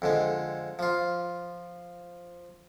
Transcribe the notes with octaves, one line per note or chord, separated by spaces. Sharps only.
F2 D3 G#3
F3 F4